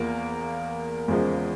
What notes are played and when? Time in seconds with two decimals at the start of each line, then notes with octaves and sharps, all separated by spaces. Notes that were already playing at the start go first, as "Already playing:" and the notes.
Already playing: E2 F3 A#3
1.08 E2 C#3 F3 G#3